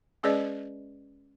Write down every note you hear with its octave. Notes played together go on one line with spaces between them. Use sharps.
G#3 C#4 G#4 B4 D5 D#5